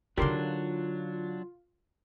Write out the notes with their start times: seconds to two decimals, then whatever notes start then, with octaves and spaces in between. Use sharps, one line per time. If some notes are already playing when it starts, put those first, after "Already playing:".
0.18 D3 F#3 D4 D#4 F4 G4 A#4 C6